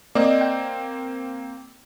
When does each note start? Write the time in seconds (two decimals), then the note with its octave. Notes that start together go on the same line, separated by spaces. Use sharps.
0.15 A#3 C4 D5 D#5
0.41 G5